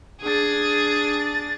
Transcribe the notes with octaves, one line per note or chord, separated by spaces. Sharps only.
D4 G#4 A6